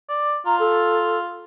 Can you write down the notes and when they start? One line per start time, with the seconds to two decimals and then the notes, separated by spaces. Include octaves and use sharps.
0.09 D5
0.46 F4 A#5
0.60 A4